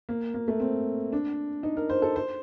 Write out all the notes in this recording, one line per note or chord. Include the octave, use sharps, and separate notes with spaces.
A#3
A#3
A3
C4
D4
D#4
A#4
C5
A4
C5